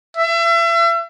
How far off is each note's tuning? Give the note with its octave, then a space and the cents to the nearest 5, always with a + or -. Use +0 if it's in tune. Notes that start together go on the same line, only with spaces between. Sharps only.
E5 +35